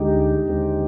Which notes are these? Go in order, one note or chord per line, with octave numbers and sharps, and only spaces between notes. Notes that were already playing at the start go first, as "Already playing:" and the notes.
Already playing: D2 D3 G#3 D#4 G4
D#2 D3 G#3 C4